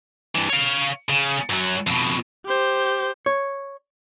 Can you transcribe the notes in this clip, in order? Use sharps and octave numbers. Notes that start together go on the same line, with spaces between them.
G2 E3
C#5 F5
C#3
F#2 F#3
F2 B2
G4 C5
C#5